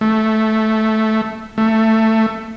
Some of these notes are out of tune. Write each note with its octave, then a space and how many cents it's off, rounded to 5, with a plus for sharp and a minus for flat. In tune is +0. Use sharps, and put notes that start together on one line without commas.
A3 -5
A3 +15